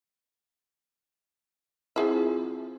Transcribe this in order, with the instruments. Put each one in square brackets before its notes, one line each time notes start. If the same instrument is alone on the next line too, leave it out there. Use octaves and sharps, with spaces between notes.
[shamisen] F3 G#4 E5 [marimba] C4 E4 F4